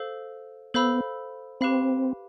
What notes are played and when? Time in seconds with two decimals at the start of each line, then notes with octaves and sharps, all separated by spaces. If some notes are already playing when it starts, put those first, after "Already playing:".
Already playing: A4 C5 F5
0.74 B3 A4 C5 F5 B5 E6
1.61 C4 G4 B4 F5 B5